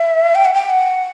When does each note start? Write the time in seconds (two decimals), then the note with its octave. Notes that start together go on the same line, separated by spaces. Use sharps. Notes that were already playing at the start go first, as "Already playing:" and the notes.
Already playing: E5
0.35 G5
0.45 F#5
0.54 G5
0.70 F#5